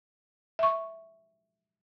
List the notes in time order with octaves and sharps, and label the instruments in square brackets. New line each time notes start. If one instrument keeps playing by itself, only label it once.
[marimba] E5 C#6